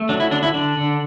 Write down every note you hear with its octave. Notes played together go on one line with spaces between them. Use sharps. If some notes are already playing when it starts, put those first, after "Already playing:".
Already playing: A3
F#3 D4
E4
D3 D4
E4
D3 D4
D3